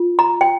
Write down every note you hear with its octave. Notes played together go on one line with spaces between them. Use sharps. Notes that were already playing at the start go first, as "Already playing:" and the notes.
Already playing: F4
A#5
G5